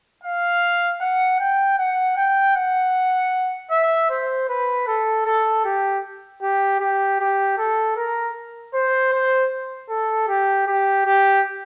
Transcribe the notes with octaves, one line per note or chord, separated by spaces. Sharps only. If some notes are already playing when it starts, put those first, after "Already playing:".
F5
F#5
G5
F#5
G5
F#5
E5
C5
B4
A4
A4
G4
G4
G4
G4
A4
A#4
C5
C5
A4
G4
G4
G4